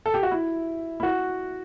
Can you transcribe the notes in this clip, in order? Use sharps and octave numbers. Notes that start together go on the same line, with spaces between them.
A4
G4
F#4
E4
E4
F#4